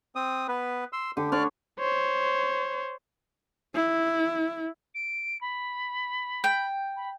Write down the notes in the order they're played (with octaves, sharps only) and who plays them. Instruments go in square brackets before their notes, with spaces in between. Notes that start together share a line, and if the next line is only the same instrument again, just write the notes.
[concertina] C4 D#6
B3 B4
C6 E6
[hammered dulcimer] D3 [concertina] G4
[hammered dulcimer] D3 C#5 [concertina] D5 F6 F#6
[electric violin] C5 C#5
[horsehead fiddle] E4
[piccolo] D7
B5
[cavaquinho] G5
[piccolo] B5